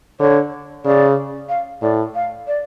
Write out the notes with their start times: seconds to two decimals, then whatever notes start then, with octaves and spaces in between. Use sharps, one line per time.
0.20 D3 C#5
0.85 C#3 D5
1.49 F5
1.82 A2 D5
2.15 F5
2.47 D5